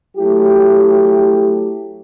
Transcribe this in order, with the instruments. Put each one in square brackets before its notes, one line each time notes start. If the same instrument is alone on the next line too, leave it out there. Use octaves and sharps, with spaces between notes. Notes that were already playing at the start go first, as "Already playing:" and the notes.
[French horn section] F#3 A3 E4 G4